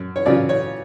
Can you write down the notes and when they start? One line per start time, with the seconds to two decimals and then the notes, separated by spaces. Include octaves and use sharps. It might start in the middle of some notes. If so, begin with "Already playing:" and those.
Already playing: F#2
0.16 C#5
0.26 C#3 F#3 C#4 F4 D5
0.49 C#5